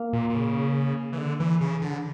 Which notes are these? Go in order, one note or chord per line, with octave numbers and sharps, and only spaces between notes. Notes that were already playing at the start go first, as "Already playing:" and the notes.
Already playing: A#3
A#2
A#2
C#3
E3
D3
E3
C#3
D3